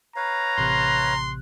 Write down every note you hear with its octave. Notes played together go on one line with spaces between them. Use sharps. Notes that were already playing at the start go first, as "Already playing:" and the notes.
B4 C#5 F5 A#5
A1 C3 C6 F#6